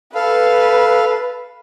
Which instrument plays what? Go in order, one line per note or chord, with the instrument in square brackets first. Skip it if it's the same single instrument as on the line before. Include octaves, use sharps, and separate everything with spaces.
[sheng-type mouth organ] A4 F5 [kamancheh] B4